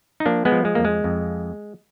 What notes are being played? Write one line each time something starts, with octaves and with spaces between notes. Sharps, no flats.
D#4
F3 A#3 D4
G#3 B3
F3
G#3
F2 A#3
G#3
F2